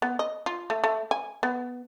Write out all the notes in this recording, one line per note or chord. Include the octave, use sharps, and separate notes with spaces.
B3
D#5
F4
A3
A3
G#5
B3